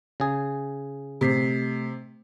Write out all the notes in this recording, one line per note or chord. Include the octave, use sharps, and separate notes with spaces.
C#3 G#4
C3 A3 B6 C7